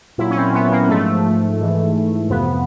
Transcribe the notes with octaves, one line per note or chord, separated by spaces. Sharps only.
A#2 F#3 E4
C#4
C4
B3
A#3
G#2 F3 A3
G#2 E3
F2 C3 F3 B3